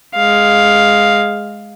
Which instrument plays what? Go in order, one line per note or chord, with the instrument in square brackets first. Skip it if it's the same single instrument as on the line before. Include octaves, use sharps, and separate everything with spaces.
[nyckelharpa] G#3 F5